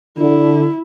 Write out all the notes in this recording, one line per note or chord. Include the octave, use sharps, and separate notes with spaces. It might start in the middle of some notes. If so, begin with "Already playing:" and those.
D3 E4